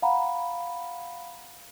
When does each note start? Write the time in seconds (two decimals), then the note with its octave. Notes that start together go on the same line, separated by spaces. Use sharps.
0.02 F5 F#5 A#5 B5